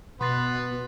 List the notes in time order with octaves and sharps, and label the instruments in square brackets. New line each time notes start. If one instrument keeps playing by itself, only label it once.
[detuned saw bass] B2 [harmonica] B3 B4 [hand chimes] C6 A6 C7